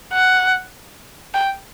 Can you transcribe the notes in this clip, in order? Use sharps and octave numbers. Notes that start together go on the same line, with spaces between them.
F#5
G5